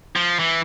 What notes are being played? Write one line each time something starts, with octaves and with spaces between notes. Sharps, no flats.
F3
E3